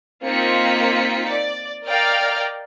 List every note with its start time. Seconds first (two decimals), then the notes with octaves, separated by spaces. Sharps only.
0.24 A#3 C4 D#4 F4 B6 C#7
1.28 D5
1.87 A#4 D5 D#5 F5 G5 F6